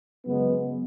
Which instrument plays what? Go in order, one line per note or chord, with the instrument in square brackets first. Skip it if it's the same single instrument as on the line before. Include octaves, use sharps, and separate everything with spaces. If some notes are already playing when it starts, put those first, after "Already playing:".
[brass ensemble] F#2 C#3 G#3 B3